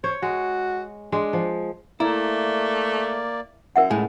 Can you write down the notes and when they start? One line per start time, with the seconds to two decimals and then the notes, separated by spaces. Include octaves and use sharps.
0.04 C5 C#5
0.22 G#3 F#4
1.12 G#3 D4
1.33 F3
2.00 A3 A#3 E4 D5 A#5
3.76 F#2 A#4 E5 F#5
3.91 C#2 A2 G#3 G#5